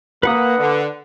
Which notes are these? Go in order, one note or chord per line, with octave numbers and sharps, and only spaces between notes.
A#3 B4 F#5 D#6
D3